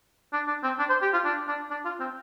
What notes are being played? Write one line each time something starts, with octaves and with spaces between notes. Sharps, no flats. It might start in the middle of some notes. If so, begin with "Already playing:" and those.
D4
D4
C4
D4
C5
G4
F4
D4
D4
D4
F4
C4